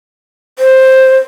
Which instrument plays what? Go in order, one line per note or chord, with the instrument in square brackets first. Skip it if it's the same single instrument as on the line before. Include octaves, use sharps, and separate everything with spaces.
[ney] C5